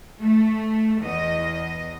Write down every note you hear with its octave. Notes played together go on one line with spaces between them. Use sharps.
A3
E2 D#5